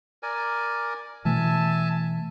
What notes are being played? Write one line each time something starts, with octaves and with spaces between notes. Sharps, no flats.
A#4 D5 G#5
B2 E3 A3 E5 G#5 A5